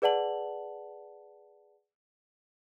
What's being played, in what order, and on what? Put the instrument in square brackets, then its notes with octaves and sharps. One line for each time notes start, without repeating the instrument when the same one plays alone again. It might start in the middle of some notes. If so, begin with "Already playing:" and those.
[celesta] G#4 B4 D5 F#5 A5 F#7